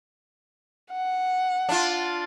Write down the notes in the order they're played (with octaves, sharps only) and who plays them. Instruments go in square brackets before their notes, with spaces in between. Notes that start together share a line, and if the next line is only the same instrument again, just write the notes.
[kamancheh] F#5
[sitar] D4 F4